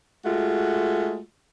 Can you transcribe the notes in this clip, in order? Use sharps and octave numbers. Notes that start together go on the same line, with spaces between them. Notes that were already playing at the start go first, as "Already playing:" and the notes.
G#3 A3 F4 F#4